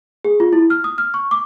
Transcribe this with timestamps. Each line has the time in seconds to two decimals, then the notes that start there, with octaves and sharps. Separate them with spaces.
0.25 G#4
0.40 F4
0.53 E4
0.70 F6
0.84 D#6
0.98 F6
1.14 C#6
1.31 D6